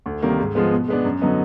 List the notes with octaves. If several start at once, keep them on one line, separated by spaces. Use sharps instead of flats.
D2
C3 D#3 G3 A#3
G#2
F3 G#3 B3
B2
G#3 B3 D4
F#2
D3 F#3 B3 D#4